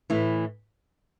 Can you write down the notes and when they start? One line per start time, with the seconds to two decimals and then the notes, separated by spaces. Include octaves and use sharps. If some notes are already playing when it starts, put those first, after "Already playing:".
0.10 A2 E3